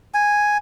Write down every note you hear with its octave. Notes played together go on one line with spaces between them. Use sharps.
G#5